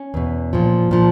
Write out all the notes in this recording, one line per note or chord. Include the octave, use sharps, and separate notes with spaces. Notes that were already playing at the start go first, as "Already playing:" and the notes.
Already playing: C#4
E2 B2
A#2 F3
A#2 F3